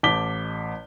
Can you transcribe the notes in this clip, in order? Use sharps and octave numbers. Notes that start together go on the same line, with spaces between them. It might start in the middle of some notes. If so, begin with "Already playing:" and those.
A1 A5 D6 B6 G7